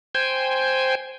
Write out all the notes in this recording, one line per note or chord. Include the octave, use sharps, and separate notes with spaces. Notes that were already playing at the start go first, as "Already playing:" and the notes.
C5 G5 G#5